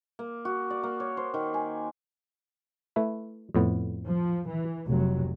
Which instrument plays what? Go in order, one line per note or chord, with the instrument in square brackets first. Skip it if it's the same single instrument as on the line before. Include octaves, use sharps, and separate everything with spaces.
[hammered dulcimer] A#3
F#4
D5
A#3
C#5
C5
D#3
G#5
[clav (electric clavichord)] A3 E4 B4
F2 A2 B3
[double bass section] F3
E3
F1 F#3